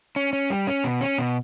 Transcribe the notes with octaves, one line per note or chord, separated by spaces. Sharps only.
C#4
C#4
G3
C#4
B2
C#4
B2